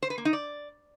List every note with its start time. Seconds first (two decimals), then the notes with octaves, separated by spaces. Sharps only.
0.03 C5
0.10 B4
0.18 A#3
0.25 D#4
0.33 D5